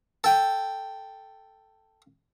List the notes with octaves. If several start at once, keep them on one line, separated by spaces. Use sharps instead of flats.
A4 G5